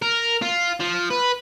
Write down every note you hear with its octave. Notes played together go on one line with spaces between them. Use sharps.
A#4
F4
F3
B4